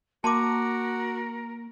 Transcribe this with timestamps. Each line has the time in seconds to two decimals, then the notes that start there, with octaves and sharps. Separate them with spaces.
0.24 A#3 F#4 A#4 A5 C6 D6